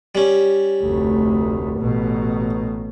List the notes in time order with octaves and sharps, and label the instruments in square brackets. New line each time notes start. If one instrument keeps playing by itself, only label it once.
[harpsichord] G3 C#4
[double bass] F1 D2
A1 B2